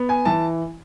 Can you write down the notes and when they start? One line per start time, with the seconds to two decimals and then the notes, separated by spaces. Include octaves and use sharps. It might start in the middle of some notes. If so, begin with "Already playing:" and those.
Already playing: B3
0.09 G#5
0.25 E3 A5